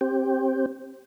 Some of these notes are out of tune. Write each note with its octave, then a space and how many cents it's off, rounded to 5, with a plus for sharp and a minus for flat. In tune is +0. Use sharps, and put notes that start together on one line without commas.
C4 +20 G4 +0